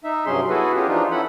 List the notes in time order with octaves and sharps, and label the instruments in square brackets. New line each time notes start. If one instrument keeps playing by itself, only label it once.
[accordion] D#4 E5
G2 C3 F#3 C#4 G#4 C6
B3 E4 F#4 G#4 A4 B4
C#4 F4 G4 G#4
E3 F3 D4 D#4 F4
C#4 E4 A4 F#5 B5